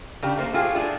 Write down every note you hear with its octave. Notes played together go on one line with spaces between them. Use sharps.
C#3 D4 G4
A3 A#3 C5
A3 F4 G4 G#4
A2 A3 D4 F4 G#4